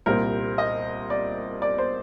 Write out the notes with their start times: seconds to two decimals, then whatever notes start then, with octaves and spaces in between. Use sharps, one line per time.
0.06 C2 A#2 G3 C4 A#4
0.58 D#5
1.10 D5
1.62 D5
1.78 C5